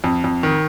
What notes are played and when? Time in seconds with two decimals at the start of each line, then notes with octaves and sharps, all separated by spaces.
0.04 F2
0.24 F2
0.43 D#3